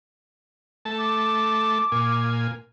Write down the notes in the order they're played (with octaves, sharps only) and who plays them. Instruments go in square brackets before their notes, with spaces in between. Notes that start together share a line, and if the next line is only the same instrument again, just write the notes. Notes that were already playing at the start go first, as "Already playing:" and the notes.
[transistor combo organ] A3 A5
[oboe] D6
[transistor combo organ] A#2 G#5